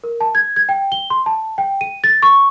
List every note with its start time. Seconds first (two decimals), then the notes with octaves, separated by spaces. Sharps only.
0.04 A#4
0.21 A5
0.35 G#6
0.56 G#6
0.69 G5
0.92 G7
1.10 C6
1.26 A5
1.58 G5
1.81 D#7
2.04 A6
2.22 C#6